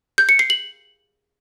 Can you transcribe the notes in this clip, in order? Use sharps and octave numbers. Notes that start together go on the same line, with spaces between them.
G6
C#7
C7
F#7